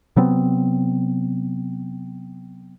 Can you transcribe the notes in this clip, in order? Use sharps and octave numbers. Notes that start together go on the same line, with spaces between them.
C3 F#3 B3 C4